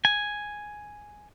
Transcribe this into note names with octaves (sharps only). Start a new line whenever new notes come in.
G#5